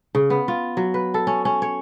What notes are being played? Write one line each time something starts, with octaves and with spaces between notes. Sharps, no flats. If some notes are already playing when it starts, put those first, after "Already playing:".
C#3
B3
F4
F#3
B4
A4
C#4
C#4
C#5